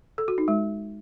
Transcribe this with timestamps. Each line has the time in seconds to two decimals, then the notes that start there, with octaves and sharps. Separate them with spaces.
0.18 A4
0.28 F#4
0.38 D#4
0.48 G#3